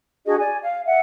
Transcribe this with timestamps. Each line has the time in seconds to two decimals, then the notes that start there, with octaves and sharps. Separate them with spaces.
0.25 D4 F#4 G#4 D#5
0.38 D5 G#5
0.62 F5
0.84 E5 F#5